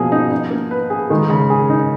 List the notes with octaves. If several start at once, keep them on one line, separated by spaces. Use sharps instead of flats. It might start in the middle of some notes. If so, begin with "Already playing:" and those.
Already playing: B2 F3 A#3 G#4
D#4
D#4
A#3
B4
G#4
D#3 G#3
C#3
G#4
D#4